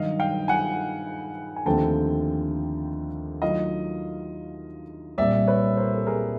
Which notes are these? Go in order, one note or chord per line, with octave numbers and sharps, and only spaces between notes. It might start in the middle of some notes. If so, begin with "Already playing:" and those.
Already playing: G2 D#3 F#3 D#5 F5
F5 G5
F#5 G#5
G#5
D#2 D3 F3 A3 C4 G5 A5
D#3 F#3 A3 D4 F4 D#5 F5
C2 A#2 G3 D5 E5
B4 C#5
A#4 C5
A4
G#4 A#4